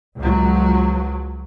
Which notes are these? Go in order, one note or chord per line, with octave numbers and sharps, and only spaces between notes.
C#2 F3 F#3